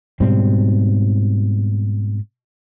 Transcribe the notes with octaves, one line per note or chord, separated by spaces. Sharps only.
G#2 B2 G3 C4